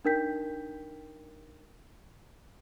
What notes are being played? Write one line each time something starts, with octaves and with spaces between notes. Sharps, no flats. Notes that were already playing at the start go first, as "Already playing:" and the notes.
D4 D#4 A#4 G5 G6 B6